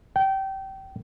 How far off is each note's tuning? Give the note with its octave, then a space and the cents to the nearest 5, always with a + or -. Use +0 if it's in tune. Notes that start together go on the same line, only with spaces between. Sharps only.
G5 -25